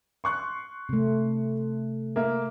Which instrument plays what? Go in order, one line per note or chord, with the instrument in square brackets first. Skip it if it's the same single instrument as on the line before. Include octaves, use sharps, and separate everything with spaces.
[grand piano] C6 C#6 F#6
[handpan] C3 A3
[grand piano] A#3 E5